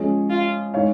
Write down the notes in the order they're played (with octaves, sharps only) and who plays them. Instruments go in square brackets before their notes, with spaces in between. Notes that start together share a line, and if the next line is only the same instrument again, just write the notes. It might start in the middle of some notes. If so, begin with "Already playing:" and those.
Already playing: [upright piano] F3 G#3 C#4 G#4
[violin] F4
[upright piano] G#3 D#4 C#5 F5